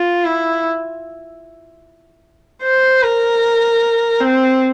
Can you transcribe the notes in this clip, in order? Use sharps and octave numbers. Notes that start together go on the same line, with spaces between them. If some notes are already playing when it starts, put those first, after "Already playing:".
Already playing: F4
E4
C5
A#4
C4